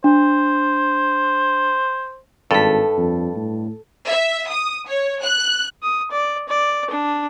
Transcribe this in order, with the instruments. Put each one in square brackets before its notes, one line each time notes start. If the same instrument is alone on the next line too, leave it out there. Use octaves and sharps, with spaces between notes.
[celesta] D4 [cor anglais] C5
[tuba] G#1 [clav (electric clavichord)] G2 [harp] A4 B6
[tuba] F2
A2
[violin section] E5
D#6
C#5
F#6
[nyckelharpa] D#6
D5
D5
D4